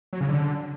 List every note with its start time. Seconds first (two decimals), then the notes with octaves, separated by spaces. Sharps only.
0.13 F#3
0.21 C#3
0.29 D3